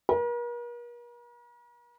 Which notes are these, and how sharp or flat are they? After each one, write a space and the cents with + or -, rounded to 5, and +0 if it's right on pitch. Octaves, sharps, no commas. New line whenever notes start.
A#4 +45